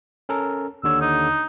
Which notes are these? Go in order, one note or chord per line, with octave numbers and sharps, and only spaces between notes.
C#4 A4 A#4
D#2 D3 C#5 E6
D#4